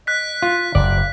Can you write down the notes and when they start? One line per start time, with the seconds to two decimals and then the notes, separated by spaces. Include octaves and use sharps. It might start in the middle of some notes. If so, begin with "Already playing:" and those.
0.07 D#5 F#6 B6
0.42 F4 F5
0.75 F#1 D5